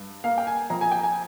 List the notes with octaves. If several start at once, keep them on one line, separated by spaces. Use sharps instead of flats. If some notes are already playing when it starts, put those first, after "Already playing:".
Already playing: G2
A#3 F5
G5
G#5
F2 A#5
G#5
G5
G#5